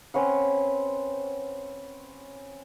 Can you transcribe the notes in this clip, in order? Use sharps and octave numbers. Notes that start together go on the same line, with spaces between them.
C4 C#4 B4 F#5